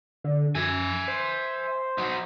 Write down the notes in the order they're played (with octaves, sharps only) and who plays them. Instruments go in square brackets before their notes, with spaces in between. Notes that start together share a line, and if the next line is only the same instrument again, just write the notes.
[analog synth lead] D3
[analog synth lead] F#2 [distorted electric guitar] E5 G#5
[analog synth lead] C5
[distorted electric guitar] F#3 D#4